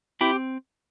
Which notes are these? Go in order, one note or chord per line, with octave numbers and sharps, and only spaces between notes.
C4 E4 G4